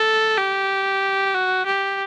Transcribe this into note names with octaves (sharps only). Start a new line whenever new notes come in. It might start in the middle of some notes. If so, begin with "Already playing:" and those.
Already playing: A4
G4
F#4
G4